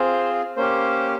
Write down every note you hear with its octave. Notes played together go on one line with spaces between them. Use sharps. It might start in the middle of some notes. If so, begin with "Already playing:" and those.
Already playing: C4 F4 G#4 C5
A#3 C#4 G4 C5